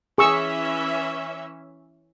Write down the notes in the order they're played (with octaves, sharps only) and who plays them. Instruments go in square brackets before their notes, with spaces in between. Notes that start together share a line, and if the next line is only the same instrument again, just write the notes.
[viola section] E3 C#4 E5 [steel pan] G#4 C#6 E6